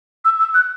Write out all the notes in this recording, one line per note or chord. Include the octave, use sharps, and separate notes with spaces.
E6
E6
F#6